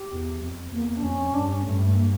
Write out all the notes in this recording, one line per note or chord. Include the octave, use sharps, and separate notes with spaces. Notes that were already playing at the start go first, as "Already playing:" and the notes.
Already playing: G4
E2
F2
E2 A#3
A#3
D4
F2 C#4
G2 D4
C#4
G2 A3
A3
A#3